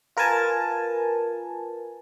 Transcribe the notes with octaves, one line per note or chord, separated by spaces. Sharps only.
F4 A#4 B4 G#5 A5